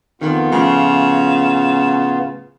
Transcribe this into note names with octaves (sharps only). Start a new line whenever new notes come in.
F2 D#3 B3 F4
A2 C#3 F3